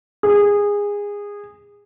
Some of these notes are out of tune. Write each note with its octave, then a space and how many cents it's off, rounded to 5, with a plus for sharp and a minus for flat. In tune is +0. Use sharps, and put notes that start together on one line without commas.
G#4 -20